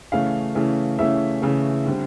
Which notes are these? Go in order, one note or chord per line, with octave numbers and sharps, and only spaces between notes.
C#3 E3 A3 C#4 F5
C#3 E3 A3 C#4
C#3 E3 A3 C#4 E5
C#3 E3 A3 C#4
D3 G3 C4